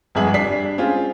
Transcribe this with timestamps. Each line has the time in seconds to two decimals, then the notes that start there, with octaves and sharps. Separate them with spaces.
0.15 G1 F2 G#2 G#4 E5 F#7
0.34 G3 D4 B6 C7
0.78 G#3 C4 C#4 F4